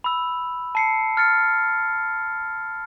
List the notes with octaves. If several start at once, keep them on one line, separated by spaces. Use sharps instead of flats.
B5 E6
A5 C7 C#7
F6 A6 C#7